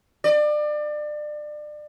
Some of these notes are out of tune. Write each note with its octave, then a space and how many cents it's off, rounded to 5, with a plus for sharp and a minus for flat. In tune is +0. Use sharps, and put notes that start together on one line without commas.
D5 +30